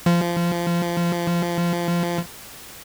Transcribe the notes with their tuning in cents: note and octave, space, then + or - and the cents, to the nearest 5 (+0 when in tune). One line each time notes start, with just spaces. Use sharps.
F3 -20